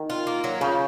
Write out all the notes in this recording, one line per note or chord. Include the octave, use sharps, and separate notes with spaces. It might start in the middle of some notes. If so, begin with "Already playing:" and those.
Already playing: D#3
F4
A#3
F#3
C#3 F3